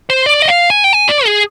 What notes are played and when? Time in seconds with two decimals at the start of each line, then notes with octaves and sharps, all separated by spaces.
0.10 C5
0.26 D5
0.42 D#5
0.48 F5
0.70 G#5
0.84 G5
0.93 G#5
1.09 D5
1.26 G#4